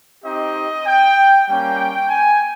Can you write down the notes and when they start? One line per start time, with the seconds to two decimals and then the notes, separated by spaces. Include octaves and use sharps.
0.24 C4 D#4 G4 D#5
0.86 G5
1.47 G3 A#3 C#4 G5
2.10 G#5